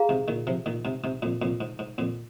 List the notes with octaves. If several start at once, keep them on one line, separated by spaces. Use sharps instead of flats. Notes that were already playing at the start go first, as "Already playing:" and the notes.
Already playing: G#4 F5 A#5
G#2 C3
A#2 D#3
C3 F3
A#2 D#3
G#2 C3
G#2 C3
F2 A#2
F2 A#2
G#2
G#2
F2 A#2